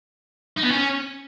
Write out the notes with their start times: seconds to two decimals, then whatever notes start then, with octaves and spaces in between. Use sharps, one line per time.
0.57 D#4
0.64 B3
0.71 C#4